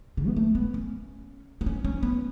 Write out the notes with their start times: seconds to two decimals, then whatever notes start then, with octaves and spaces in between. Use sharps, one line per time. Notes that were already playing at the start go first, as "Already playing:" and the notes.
0.17 C#3
0.28 B3
0.37 A3
0.55 B3
0.74 C#4
1.61 B3
1.66 C#4
1.84 C#4
2.03 B3